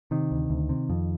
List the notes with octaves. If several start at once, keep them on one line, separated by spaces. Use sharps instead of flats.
C3 D#3
D2
D2
C3
F2